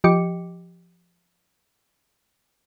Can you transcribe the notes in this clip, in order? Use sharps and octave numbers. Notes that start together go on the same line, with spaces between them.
F3 G4 D#5 G5 D6 C#7